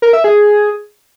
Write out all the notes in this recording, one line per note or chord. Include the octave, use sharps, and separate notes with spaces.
A#4
E5
G#4